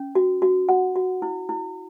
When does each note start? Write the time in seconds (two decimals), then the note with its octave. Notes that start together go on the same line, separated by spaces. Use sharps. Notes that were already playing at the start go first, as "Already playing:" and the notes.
Already playing: C#4
0.15 F#4
0.42 F#4
0.69 F#4 F#5
0.96 F#4
1.22 E4
1.49 E4